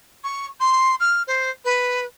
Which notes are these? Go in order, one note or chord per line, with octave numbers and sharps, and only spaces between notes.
C#6
C6
F6
C5
B4